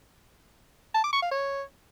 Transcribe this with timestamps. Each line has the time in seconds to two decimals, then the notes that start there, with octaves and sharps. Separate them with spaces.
0.94 A5
1.04 D6
1.13 C#6
1.22 F5
1.32 C#5